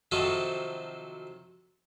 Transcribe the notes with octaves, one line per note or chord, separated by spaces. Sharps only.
C3 D#3 F3 F#3 D#4 A4